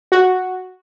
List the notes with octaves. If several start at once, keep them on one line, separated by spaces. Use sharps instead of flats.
F#4